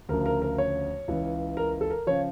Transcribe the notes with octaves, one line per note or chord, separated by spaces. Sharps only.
D2 C#3 F3 A#4
A#4
A#4
C#5
C#2 C#3 E3
A#4
A4
A#4
C#3 F3 C#5